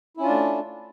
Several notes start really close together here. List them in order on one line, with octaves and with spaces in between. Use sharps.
E4 C#4 F4 D4 A3